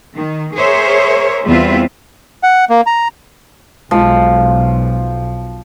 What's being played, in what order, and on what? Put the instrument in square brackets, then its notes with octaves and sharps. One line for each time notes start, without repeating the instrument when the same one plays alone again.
[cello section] D#3
G#4 A#4 C5 C#5 E5
E2 G3 C4 F4 B4 E5
[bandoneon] F#5
A#3
A#5
[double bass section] B1 [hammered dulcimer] F3 [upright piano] G#3 F4